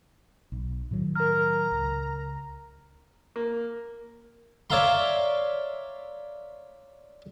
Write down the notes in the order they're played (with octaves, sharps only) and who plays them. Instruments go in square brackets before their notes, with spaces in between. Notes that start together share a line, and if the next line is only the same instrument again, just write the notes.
[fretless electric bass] B1
A2 D#3 F#3
[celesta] A#4 F6 [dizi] A#5
[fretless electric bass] C#2
[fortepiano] A#3
[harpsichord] C#5 D5 E5 F5 A#5 C6